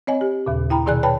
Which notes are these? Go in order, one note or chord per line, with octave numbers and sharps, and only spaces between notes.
C4 C#5 D#5 G#5
G4
D#2 A#2 C#3
E4 G5 A#5 B5
B2 D#3 G#4 D5 G#5 F#6
B4 C#5 G5 A5 B5